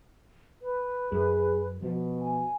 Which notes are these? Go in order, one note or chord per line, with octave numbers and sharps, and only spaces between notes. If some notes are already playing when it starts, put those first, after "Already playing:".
B4
F#2 G#4
B2 F3
G#5